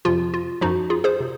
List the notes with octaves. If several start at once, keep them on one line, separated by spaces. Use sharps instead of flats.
F2 C3 F3 F4
F4
F#2 F3 D#4 F#4
F4 G#4
G#4 C5
C3